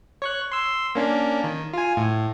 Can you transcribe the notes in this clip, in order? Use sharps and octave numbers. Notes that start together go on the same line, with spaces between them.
C#5 C#6 F#6
C6 E6
A#3 C#4 D4
D#3
F4 G#5
A2